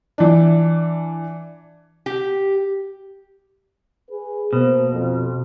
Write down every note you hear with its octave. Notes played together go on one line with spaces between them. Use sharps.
E3 D4
G4
G#4 B4
B2 A#3 C5
F2